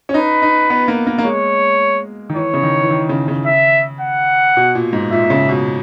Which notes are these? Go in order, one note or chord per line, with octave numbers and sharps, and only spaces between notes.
C#4
D#4 B4
D#4
B3
A#3
A#3
A#3
G#3 C#5
D#3
E3 C#5
C#3
D#3
E3
D#3
C#3
C#3
E5
F#5
B2
A#2
G#2
A#2 E5
C#3
B2